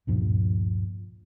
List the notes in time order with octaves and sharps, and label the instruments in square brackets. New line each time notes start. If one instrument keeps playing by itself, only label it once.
[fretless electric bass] D2 G2 A#2 F3